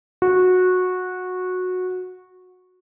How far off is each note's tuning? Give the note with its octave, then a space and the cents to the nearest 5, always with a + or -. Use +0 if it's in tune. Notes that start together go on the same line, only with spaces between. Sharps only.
F#4 -15